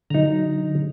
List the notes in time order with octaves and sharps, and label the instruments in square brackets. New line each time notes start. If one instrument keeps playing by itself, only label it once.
[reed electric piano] D3 F#3 [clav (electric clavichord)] D#4 A#5